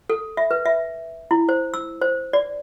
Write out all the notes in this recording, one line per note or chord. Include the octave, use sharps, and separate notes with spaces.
A4
E5
B4
E5
E4
C5
E6
C5
D5